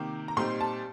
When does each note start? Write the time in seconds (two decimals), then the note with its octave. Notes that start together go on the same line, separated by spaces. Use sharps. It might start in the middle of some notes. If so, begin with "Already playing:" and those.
Already playing: C3 D#3 A#3 D6
0.28 A#5
0.37 A#2 G3 C4 D#4 C6
0.61 A5